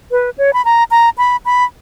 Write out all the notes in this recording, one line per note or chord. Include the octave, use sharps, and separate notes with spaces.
B4
C#5
B5
A#5
A#5
B5
B5